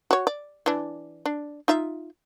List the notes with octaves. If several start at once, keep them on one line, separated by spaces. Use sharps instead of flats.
F#4 C#5
D5
E3 D4
D4
D#4 F4 E5